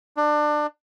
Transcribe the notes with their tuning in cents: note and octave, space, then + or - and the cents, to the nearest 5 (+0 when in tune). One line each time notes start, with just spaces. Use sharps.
D4 +25